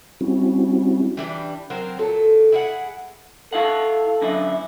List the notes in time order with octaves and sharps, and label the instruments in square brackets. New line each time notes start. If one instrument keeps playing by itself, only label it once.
[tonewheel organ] G3 C4 C#4 E4 F#4
[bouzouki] E3 G3 D4
F#3 C4 A#4 C5
A#2 F#3 A4
E4 G#4 F#5
[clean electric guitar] E4 F5 F#5 [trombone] A4
[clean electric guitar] F#2 D3 E4